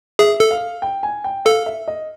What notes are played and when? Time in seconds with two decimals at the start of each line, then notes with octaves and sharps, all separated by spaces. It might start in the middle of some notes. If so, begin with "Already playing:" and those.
0.19 G#4 E5
0.40 A4
0.51 F5
0.82 G5
1.03 G#5
1.24 G5
1.45 A4 F5
1.66 E5
1.88 D#5